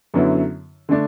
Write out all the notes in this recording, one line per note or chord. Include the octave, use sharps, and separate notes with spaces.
F#2 D3 F#3 B3 E4
D3 A3 D4